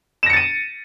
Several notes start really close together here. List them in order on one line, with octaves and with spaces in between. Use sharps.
E7 A#6 C#7 A6 D#7